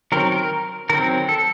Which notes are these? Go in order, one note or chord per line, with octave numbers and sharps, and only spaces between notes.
D#3 F#3 C4 A#4
A#4
D#3 F#3 C4 A#4
A4